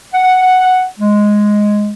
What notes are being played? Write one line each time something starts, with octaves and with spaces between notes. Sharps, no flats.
F#5
G#3